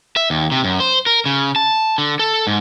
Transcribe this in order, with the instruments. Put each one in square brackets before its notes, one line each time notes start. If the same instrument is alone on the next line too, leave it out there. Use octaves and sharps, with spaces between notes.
[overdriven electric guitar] E5
D#2
C3
F#2
C5
A#4
C#3
A5
D3
A4
G#2